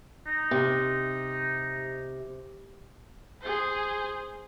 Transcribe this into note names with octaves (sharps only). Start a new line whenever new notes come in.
D#4
C3
G#4 C5